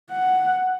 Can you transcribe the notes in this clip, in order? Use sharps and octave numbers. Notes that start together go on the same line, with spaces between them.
F#5